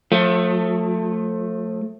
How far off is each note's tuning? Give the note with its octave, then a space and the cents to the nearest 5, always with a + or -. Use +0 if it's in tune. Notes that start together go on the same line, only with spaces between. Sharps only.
F3 +40 A3 +10